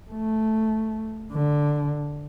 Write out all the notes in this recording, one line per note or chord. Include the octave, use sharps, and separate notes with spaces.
A3
D3